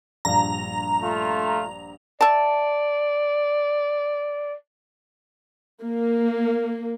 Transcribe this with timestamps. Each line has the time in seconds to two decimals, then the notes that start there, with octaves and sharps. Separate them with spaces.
0.25 A#1 G2 F5 A#5
1.00 A3 F4
2.21 D5 E5 A5
5.82 A#3